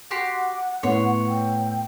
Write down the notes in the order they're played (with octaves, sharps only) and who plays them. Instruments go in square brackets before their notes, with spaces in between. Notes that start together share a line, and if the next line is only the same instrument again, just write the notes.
[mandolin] F#4 G4 C6 [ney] F#5
[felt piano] A2 B3 [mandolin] C#5 C6 C#6
[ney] G5